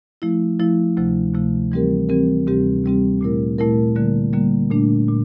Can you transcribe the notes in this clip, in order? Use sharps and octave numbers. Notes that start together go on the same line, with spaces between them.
F3 A3 E4
F3 A3 E4
D2 C3 F3 A3
D2 C3 F3 A3
E3 G3 C4 G4 A#4
E3 G3 C4 G4 A#4
D2 C3 G3 C4 G4
D2 C3 G3 C4 G4
A#2 A3 E4 A#4
A#2 A3 E4 A#4
D3 G3 A#3
D3 G3 A#3
A#2 A3 D4
A#2